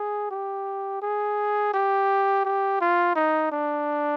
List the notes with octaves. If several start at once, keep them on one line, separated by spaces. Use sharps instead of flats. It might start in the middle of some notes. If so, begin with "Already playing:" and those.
Already playing: G#4
G4
G#4
G4
G4
F4
D#4
D4